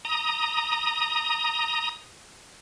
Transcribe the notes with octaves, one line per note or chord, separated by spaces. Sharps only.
A#5 D#6